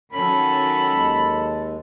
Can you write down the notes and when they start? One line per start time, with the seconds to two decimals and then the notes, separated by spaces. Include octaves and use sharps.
0.13 D#3 F#3 C#4 A4 B5
0.86 D#2 G#3